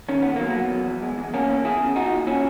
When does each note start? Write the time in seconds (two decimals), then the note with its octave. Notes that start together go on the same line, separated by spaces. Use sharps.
0.09 D#3 C#4
0.22 D#2 B3
0.36 F#3 A#3
0.50 B3
0.56 F#3
0.71 E2
0.87 E2
1.02 G#3
1.18 E2
1.33 E2 A#3 C#4
1.49 E2
1.65 E2 E4 G#4
1.80 C#3
1.96 A#2 D#4 F#4
2.12 A#2
2.27 A#2 C#4 E4